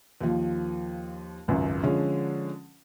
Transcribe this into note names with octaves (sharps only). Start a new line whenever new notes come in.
D#2 F3
G#1 C#2 F#2
D3 F3 G#3 C#4